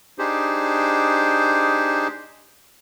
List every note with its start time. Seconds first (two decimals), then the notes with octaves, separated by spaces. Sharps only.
0.19 D4 D#4 G4 G#4 C5